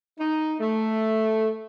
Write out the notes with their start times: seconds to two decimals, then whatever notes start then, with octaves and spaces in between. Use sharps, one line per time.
0.18 D#4
0.59 A3